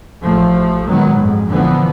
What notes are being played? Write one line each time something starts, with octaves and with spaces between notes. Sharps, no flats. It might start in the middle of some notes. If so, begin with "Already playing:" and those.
A1 F3 A3
A#2 D#3 F#3 G#3 B3
F2 G#2
A#1 D3 E3 F3 B3